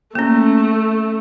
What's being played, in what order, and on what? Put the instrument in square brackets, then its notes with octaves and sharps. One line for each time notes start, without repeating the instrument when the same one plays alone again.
[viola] A3 [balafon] A#3 C#4